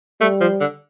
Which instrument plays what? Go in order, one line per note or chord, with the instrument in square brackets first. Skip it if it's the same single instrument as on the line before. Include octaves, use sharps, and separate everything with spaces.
[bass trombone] G3 [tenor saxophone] A3
[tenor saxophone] F3
D3